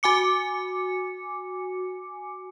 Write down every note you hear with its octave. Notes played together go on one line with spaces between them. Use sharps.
F#4 G#5 D6 C#7